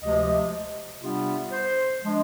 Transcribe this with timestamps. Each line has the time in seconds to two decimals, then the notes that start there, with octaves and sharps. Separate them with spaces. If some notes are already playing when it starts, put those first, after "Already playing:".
0.01 D2 C3 F3 G#3 D#5
1.01 C3 G3 B3 D4 F4
1.52 C5
2.02 F3 G#3 D4